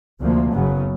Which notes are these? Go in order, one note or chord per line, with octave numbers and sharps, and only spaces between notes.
D2 C3 F3 A#3
F#1 F#2 C#3 F#3 B3